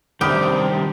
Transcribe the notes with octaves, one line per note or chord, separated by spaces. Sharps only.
C3 D#3 G3 D4 G4 B5 D#6 F6